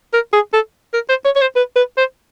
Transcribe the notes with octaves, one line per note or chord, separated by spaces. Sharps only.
A#4
G#4
A4
A#4
C5
C#5
C#5
C5
B4
B4
C5